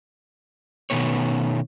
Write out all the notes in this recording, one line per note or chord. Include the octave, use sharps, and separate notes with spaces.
B2 D#3 A3 B3 C#5